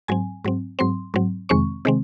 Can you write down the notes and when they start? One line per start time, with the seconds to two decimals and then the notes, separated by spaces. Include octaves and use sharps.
0.08 G#2 F#3 C4 G#5
0.44 G#2 F#3 C4
0.79 G#2 F#3 C4 C6
1.14 G#2 F#3 C4
1.49 F2 C3 D#3 G#3 C4 C#6
1.85 C3 D#3 G#3 C4